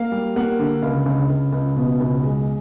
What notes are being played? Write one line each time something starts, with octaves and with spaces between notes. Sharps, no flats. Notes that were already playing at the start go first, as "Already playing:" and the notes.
Already playing: A#3 F5
G3
A#3 F#5
D3
C#2 F5
C#2
C#2
C#2
B2
C#2
G#3